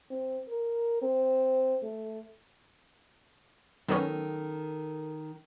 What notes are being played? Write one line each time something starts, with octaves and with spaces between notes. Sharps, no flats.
C4
A#4
C4
A3
D#3 F#3 B3 C#4 A4 A#4